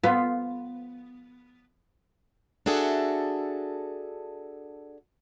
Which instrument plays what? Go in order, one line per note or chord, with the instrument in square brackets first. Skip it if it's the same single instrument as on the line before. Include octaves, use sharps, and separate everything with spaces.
[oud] B3 [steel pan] F4
[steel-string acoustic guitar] D4 F#4 G#4 A4 E5